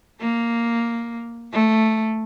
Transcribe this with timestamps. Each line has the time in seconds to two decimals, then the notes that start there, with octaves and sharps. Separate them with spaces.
0.20 A#3
1.53 A3